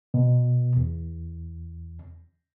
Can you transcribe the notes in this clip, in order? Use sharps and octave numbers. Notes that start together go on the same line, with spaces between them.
B2
E2